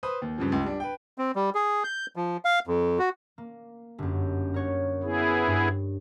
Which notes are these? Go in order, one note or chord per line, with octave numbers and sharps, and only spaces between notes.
B4 C5 D#6
D#2
G2 C#3 F3
C#2 C#3
G3 D4
B4 G5
C4
G3
G#4
G6
F3
F5
F2
F#4
A#3
G1 F#2
A#4 C#5 F#5
B3 E4 G#4
G2